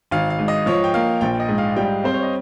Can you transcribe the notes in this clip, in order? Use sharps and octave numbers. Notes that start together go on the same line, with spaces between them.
G#1 F5
F5
G#2
D#5
F3 C#5
G5
A#3 F5
A#1 G5
D#5
G#2
F5
G3 G5
C4 C5
C#5
D#5